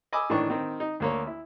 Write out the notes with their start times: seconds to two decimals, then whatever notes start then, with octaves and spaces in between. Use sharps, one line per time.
0.13 D#5 G#5 B5 D6 E6
0.30 A2 D#3 E3 D4 C#6
0.50 D#3 C4
0.80 D#4
1.00 D2 A#3 C#5
1.27 E4